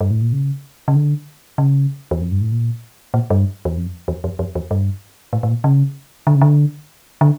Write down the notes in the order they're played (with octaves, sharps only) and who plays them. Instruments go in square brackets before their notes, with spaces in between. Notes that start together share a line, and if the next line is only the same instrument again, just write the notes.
[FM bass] G2
A2
A#2
C#3
C#3
D3
C#3
E2
F2
G2
A2
A#2
A#2
G2
E2
F2
E2
F2
F2
E2
G2
A2
A2
A#2
C#3
D3
C#3
D3
D3